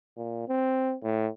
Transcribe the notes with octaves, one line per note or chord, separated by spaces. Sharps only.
A#2
C4
A2